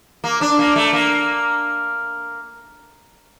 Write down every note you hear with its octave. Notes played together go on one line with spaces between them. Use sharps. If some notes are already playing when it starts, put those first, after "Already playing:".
A#3
D4
A#3
A3
A#3